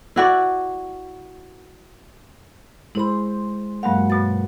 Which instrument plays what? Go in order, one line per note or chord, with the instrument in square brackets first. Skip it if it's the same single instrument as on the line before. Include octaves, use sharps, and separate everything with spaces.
[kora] E4 F#4 D5
[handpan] G#3 G#4 C5 [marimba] E4 B5
[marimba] G2 G#3 F5 [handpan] F#3 A#3 F#5
[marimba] G2 B2 A6 [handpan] F#4